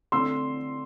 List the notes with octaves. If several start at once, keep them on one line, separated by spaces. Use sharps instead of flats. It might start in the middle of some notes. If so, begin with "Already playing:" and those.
D3 A3 C4 C6 E6